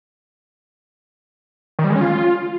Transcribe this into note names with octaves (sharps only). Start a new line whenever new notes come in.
D#3
G3
G#3
C#4
F4